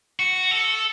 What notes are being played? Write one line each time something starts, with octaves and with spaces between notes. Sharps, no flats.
F#4
A4